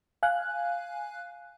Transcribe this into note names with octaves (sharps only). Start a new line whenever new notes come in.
F5 G#5 F#6